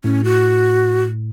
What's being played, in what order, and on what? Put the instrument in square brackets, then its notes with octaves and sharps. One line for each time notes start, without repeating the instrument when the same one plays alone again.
[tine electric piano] A2 [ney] C#4
[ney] F#4